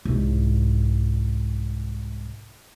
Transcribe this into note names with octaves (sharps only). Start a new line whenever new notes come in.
C2 G#2